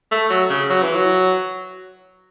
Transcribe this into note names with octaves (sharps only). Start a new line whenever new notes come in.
A3
F#3
C#3
F#3
E3
F#3